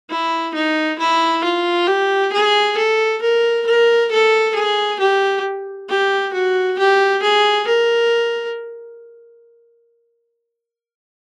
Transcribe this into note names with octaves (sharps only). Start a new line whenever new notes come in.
E4
D#4
E4
F4
G4
G#4
A4
A#4
A#4
A4
G#4
G4
G4
F#4
G4
G#4
A#4